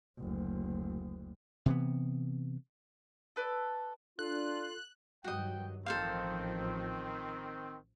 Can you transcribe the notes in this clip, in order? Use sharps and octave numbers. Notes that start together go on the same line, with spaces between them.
F#1 D2
C3 E3 B3
A4 B4 D5
D4 F4 A4 F#6
G2 D#3 F#3 F#4 D#5 G5
A1 D#3 F3 C4 A4 C5 F5